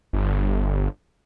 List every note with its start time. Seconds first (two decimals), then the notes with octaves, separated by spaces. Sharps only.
0.13 G1